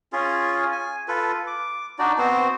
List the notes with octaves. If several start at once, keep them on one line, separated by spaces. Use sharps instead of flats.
C#4 F4 G#4
G#5
F4 A4 B4
D6
D4 D#4 F#4 D5
B3 C4 F#4 C5